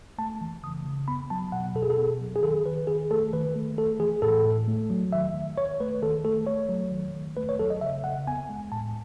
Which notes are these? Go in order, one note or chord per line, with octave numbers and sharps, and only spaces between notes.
A3 A5
E3
C#3 D#6
C#3
B3 B5
F#3 A5
B2 F#5
B2 A4
G#4
A4
B3
F#3
G#4
D#3 A4
D#3 B4
D#3 G#4
A3 A4
D#3 B4
A3
A3 A4
E3 G#4
A2 A4
A2
A3
F#3
D#3 E5
D#3
D#3 C#5
A3 B4
D#3 A4
A3 A4
A3 C#5
F#3
D#3
D#3
A3 B4
C#5
F#3 A4
D#5
C#3 E5
C#3 F#5
B3 G#5
G#3
A2 A5